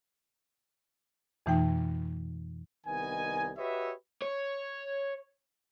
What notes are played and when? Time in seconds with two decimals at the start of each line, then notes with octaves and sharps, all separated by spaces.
1.46 F2 B2 E3 A3 D#4 G5
2.86 C2 D#3 B3 D#5 G#5
3.58 F#4 G4 B4 C#5 D#5 E5
4.22 C#5